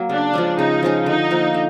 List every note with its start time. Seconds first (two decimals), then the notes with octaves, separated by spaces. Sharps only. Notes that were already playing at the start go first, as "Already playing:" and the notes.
Already playing: F#3 A#3
0.09 C#3 D4
0.33 F3 G#3 C#4
0.58 C#3 D#4
0.83 F3 G#3 C#4
1.06 D3 D#4
1.31 F3 A#3
1.54 D3